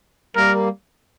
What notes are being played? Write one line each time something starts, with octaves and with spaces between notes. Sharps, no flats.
G3 A#3 A#4